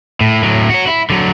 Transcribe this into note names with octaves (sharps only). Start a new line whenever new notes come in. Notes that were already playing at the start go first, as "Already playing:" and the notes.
A2
A2 F#3
F#4 C#5
E4
D3 F#3